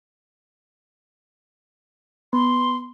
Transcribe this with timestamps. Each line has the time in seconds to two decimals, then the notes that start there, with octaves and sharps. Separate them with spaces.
2.33 B3 C6